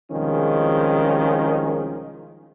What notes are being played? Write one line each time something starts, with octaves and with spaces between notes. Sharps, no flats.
C2 D#3 F3 G#3 C#4 G#4